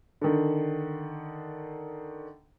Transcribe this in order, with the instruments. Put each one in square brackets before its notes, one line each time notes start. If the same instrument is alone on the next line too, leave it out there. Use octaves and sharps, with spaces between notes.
[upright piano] D3 D#3